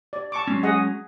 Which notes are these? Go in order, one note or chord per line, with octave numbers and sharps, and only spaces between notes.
D5
A5 C#6 D6
F#3 G#3 C#4
G#4 D#5 F#5